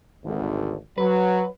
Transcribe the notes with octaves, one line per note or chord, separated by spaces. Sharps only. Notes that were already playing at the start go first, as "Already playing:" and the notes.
G#1 D2
F#3 B4